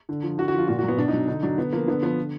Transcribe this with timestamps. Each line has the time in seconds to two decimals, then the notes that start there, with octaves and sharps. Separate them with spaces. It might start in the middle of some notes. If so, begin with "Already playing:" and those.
0.09 D3
0.23 F3
0.38 D3 F#4
0.48 F#4
0.53 F3
0.58 F4
0.68 A#2 F#4
0.79 F#4
0.83 F#3
0.88 B3
0.97 B2 D4
1.08 D#4
1.13 F#3
1.28 D3 D#4
1.43 F#3 D4
1.58 D3 B3
1.72 F3 A#3
1.87 D3 B3
2.03 F3 B3
2.18 D3